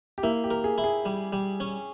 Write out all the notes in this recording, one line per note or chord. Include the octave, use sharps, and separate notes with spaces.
G4
A#3 E4
G4
A#4
G#4
E4
G#4
G3
G3
C#4